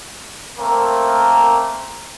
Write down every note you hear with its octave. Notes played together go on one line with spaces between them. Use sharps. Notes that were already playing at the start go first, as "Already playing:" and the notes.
A3 A#3 C4 A#4